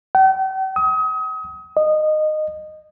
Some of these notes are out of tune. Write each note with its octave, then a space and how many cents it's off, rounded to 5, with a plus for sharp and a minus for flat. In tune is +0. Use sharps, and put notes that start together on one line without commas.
G5 -45
D#6 +35
D#5 -15